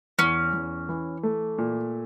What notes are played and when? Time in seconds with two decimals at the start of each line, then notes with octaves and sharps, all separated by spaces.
0.19 E2 C#4
0.54 E2
0.89 E3
1.23 A3
1.58 A#2